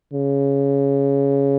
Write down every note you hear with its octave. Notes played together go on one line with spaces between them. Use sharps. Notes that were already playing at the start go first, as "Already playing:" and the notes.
C#3